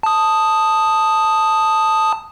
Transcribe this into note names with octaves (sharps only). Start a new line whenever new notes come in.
A5 D#6